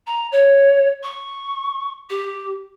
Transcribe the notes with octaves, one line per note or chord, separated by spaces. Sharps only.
A#5
C#5
C#6
G4